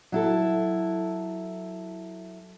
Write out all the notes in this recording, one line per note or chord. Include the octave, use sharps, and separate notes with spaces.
F#3 E4 A4